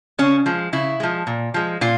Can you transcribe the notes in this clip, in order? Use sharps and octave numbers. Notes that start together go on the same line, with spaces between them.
C#3 C#4
F3 G#3
C#3 E4
F3 G#3
A#2
F3 G#3
A#2 F4